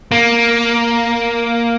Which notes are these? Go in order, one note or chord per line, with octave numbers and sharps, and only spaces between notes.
A#3